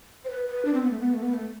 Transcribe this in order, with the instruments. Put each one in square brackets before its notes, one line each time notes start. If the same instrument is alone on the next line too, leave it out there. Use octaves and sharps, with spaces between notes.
[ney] C5
B4
B4
D4
C4
B3
A3
B3
A3
B3
A3